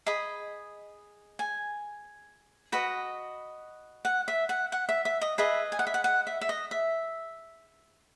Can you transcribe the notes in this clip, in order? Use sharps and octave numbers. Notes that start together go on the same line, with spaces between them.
G#4 D#5 B5
G#5
F#4 B4 D#5
F#5
E5
F#5
F#5
E5
E5
D#5
G#4 B4 D#5 E5
G#5
F#5
E5
F#5
F#5
E5
E5
D#5
E5